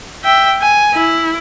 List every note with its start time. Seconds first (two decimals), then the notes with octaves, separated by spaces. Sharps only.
0.24 E5 G5
0.61 G#5
0.94 E4